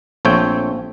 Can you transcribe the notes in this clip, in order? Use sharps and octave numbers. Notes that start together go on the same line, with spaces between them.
A#1 A3 C4 C#5 G5